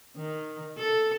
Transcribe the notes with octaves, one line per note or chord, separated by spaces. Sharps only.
D#3
A4